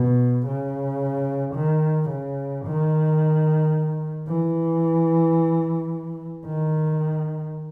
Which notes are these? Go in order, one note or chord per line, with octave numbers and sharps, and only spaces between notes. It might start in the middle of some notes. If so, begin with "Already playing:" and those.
Already playing: B2
C#3
D#3
C#3
D#3
E3
D#3